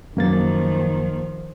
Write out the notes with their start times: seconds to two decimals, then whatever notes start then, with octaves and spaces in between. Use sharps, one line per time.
0.17 F#2 D#3 F3 A#3 A6